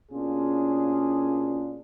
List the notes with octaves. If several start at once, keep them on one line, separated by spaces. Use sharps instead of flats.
B2 A#3 C#4 D4 F4 G#4